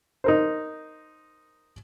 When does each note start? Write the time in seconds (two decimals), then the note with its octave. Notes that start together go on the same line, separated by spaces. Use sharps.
0.24 D#4 A#4 C5